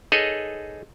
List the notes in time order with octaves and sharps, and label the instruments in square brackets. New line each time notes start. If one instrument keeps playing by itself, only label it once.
[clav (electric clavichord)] D#4 G#4 A4 B4 C#5 D#5